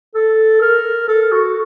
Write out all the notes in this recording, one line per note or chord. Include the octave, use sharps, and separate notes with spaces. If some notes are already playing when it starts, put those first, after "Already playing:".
A4
A#4
A4
F#4